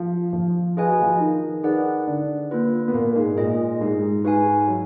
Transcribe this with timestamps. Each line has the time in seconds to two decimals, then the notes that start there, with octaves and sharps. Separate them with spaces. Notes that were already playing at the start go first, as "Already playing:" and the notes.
Already playing: F3 F4
0.33 F3 F4
0.77 F4 G#4 B4 D#5 G#5
0.88 F#4
1.01 F3 F4
1.20 D#3 D#4
1.63 D#3 D#4 G#4 B4 D5 F#5
2.07 D3 D4
2.51 A#3 F4 B4
2.88 B3
2.93 A#2 A#3
3.10 A#3
3.15 G#2 G#3
3.37 A#2 A#3 F4 G#4 D#5
3.81 G#2 G#3
4.24 G#2 G#3 F#4 B4 F5 G#5
4.67 F#3